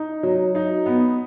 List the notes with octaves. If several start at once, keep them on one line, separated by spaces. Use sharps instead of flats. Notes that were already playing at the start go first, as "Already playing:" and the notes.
Already playing: D#4
F#3
D#4
B3